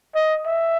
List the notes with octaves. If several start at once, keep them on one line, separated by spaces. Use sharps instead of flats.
D#5
E5